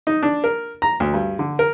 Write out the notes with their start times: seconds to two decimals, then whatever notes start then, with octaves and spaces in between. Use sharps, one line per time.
0.07 D#4
0.23 D4
0.44 A#4
0.82 A#5
1.00 D2
1.14 G2
1.39 D3
1.59 A#4